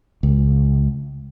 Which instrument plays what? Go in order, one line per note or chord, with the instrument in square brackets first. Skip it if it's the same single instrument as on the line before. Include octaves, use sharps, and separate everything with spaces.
[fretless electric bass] C#2